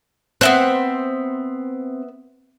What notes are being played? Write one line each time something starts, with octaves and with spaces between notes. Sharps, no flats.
B3 C4 C5 E5 F#6